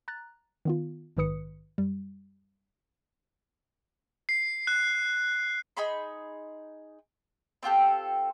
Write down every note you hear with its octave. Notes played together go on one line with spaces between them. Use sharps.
A#5 F#6 A6
D#3 B3 F4
A#1 G#2 D#3 B4 D#6 C#7
F#2 G3
C7
F#6
D#4 G#4 B5 C6
C4 F4 G4 A4